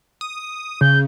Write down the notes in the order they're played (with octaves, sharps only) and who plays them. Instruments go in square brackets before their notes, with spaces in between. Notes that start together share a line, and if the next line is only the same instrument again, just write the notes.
[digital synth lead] D#6
[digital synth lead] C#3 [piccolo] G6